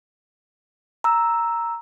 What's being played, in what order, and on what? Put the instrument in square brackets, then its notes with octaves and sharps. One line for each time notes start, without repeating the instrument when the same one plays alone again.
[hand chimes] A#5 E6